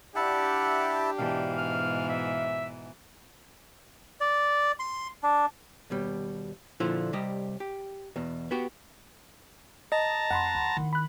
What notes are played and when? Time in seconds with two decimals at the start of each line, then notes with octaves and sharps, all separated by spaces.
0.16 D4 E4 G4 E5 F#5 A5
1.18 G#2 B2 E3 F5
1.58 F6
2.10 E5
4.21 D5
4.79 C6
5.23 D4
5.90 D#2 B2 G3
6.80 A#2 D3 F3 E4 F4
7.13 C2 G3 G4 D#5
7.60 G4
8.16 E2 B2
8.51 B3 F#4 G4
9.92 D#5 A5 A#5
10.30 F2 F#5 B5 C6
10.55 D2
10.77 D#3 E4
10.93 B5 F#6